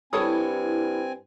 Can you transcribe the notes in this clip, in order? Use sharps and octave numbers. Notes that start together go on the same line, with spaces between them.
G2 C4 E4 A4 C#5 G#5 D#6